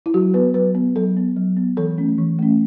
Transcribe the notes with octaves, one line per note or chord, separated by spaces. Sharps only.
E4
F#3 F#4
B3 B4
F#3 B4
B3
F#3 A4
B3
F#3
B3
E3 A4
A3 C#4
E3
A3 C#4